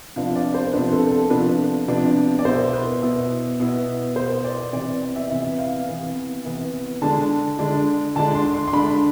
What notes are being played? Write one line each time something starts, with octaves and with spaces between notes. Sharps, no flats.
C3 F3 B3 D4 F5
D5
C5
C3 F3 B3 D4 B4
A4
A4
C3 F3 B3 D4 B4
C3 F3 B3 D4
D5
B2 B3 E4 C5
B4
B2 B3 E4
B2 B3 E4
B2 B3 E4 C5
D5
C3 E3 B3 D5
D5
E5
C3 E3 B3 E5
F5
C3 E3 B3
C3 E3 B3
D3 G#3 D4 A5
D3 G#3 D4
D3 G#3 D4 A5
C6
C6
C6
D3 G#3 D4 B5